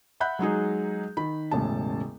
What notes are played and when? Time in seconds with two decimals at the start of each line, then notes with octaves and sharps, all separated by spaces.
0.20 E5 F#5 B5 F#6 G6
0.39 F#3 G#3 D#4 G#4
1.17 D#3 B5
1.51 E1 A1 C#3 A5